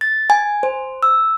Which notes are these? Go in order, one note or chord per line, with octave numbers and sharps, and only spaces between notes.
A6
G#5
C5
E6